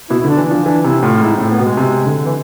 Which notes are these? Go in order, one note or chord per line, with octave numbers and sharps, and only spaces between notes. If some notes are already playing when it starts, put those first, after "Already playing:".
B2 E4
E4
D3 D4
E3
F3 D4
E3 D4
C3 E4
A2 F4
F4
G#2 E4
A2 C4
B3
B2 G#3
C3
D3
E3